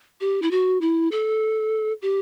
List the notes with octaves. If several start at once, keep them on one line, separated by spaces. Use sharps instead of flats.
G4
E4
F#4
E4
A4
G4